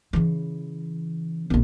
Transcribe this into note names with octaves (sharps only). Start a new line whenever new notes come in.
C#3 E3
A#1 C4